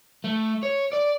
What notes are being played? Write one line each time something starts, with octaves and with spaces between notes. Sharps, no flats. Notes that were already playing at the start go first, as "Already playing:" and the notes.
A3
C#5
D5